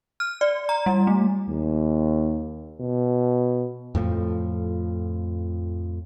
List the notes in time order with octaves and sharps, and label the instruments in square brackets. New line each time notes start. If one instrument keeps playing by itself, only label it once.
[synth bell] F6
D5
A#5
G3
A3
[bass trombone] D#2
B2
[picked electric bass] F2 A2 F3